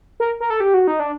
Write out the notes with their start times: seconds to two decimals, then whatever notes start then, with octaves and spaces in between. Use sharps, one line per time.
0.20 A#4
0.40 A#4
0.50 A4
0.60 G4
0.74 F#4
0.88 D#4
1.00 D4